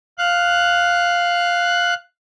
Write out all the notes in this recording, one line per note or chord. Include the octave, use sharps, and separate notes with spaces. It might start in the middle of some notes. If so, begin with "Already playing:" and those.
F5 F#6